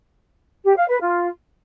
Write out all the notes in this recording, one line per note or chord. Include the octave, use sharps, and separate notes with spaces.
G4
F5
B4
F4